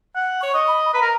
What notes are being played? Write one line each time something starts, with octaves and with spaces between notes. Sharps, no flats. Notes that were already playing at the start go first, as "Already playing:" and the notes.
F#5
C#5 C#6
D#5
B5
B4 A#5
A#4